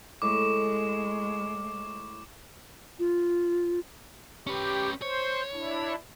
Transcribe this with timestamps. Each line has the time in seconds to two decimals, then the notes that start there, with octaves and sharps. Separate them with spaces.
0.22 A2 G#3 D6
2.99 F4
4.47 C#4 G4 B4
5.02 C5 C#5
5.53 D4 E4